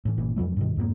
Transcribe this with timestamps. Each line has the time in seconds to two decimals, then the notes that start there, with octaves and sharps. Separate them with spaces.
0.05 A2 E3
0.18 G1 A#2 E3
0.36 F2 F3 F#3 A3
0.57 G2 B2 D#3
0.77 F2 G#2 G#3 A#3